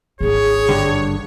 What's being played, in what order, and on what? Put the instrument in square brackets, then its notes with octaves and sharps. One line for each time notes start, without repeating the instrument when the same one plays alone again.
[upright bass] G#1 D4 [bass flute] G#4 [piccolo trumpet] C#5
[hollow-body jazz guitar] G2 D3